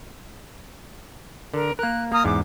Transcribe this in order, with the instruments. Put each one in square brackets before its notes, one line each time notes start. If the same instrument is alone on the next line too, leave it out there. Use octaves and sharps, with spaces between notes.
[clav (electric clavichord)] D3 [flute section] A#4
[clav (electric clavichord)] A#3 A#4 [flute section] F#6
[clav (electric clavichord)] A#3 [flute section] A#5 D#6 F6
[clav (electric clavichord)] E2 G#2 [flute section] D6